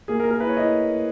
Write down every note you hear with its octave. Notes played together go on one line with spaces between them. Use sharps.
A#3 G#4
A#4
A#3
A#4
E4 B4
C#5
E4 D#5